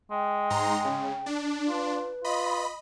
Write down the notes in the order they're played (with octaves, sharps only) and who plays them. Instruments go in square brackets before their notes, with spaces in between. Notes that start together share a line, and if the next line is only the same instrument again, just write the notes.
[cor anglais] G#3 [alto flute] G5
[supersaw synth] G#2 A#5 C6
C#3
D4
[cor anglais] F4 [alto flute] B4
[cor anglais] F4 [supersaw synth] D#5 B5